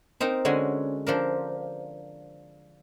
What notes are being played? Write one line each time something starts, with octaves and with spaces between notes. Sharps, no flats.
C4 D#4 A#4 A#5
D3 G#3 C#4 F#4 G#5
F3 D4 A#4